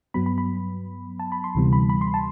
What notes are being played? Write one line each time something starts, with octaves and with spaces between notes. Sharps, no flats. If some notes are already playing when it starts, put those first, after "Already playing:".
G2 F#3 B3 B5
B5
B5
A5
B5
C6
D2 C3 E3 G3 B3
B5
B5
C6
A5